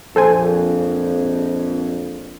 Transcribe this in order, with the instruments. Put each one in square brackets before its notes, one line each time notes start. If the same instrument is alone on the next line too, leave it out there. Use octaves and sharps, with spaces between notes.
[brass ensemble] A#1 F2 [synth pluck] A4 C5 G#5